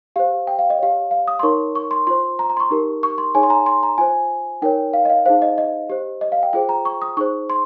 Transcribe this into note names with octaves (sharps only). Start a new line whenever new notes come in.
G4 C5 F5
G5
F5
D#5
G4 C#5 F5
F5
D#6
C6
D#4 A#4 C#5 C#6
C#6
C6
F4 C5 C6
A#5
A#5
C6
C#6
D#4 G4 A#4
C#6
C6
D#4 G#4 C#5 G#5
C6
A#5
C6
A#5
F4 C5 G#5
D#4 A#4 C#5 G5
F5
D#5
F5
D#4 G#4 C5 F5
D#5
D#5
G4 C5
D#5
F5
G5
F4 G#4 C5 G5
A#5
C#6
D#6
D#4 G#4 C5 C#6
C6